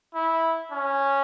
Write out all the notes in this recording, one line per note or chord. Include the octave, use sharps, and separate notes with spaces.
E4
C#4